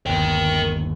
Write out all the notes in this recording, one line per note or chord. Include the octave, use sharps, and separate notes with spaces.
G1 D#2 A#4 G5